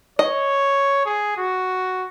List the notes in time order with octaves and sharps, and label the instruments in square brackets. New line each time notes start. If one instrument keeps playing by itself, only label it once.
[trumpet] C#5 [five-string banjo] D#5
[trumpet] G#4
F#4